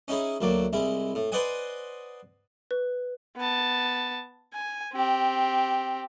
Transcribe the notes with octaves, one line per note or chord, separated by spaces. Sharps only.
C#4 D#4 E4 G#4
D2 F#3 A#3 D5
C2 G#3 E4
A2
B4 C5 D5 D#5 F#5 G#5
B4
B3 A5
G#5
C4 G4